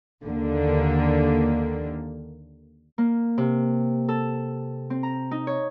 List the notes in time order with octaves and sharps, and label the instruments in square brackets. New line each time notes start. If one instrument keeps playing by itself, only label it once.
[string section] D#2 D3 A#3
[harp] A#3
C3
A4
C4
A#5
D#4
C#5